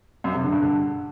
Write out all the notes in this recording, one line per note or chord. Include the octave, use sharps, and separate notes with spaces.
F#2
C3
D3
G2
D3